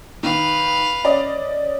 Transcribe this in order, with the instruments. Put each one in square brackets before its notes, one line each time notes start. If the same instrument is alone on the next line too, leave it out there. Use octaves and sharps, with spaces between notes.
[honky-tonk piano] D#3 [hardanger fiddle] B4 F5
[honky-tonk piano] C#4 D5 D#5